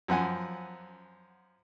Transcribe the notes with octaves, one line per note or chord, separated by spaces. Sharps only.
F#2 F3 F#5 G#5